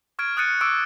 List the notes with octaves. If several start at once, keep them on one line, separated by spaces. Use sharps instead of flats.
C#6 F6 G#6 D7
D#6 F#6 A6 C#7 D#7
C#6 D6 E6 F#6 D7